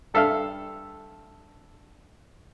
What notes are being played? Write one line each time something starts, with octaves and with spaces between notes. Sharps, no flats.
G2 A4 E5 F5 F6